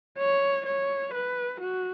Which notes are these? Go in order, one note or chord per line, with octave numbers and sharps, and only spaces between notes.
C#5
C#5
B4
F#4